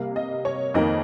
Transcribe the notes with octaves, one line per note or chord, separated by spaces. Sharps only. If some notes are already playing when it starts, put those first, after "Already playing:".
Already playing: C3 G3 A#3 F5
D#5
C#5
F2 D#3 A#3 D#5